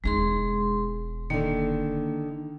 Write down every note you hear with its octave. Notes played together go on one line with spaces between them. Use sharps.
E1 G#3 D#4 G#4 C6
D3 D#3 A#3